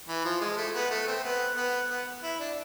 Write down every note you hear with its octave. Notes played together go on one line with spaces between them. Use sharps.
E3
F3
G#3
A3
B3
A3
C4
B3
B3
B3
E4
D4